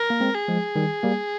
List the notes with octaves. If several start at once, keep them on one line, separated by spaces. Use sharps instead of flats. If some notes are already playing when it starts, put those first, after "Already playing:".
Already playing: A#4
A#3
G#3 C4
G#4
F3 G#3
D#3 G3
G3 A#3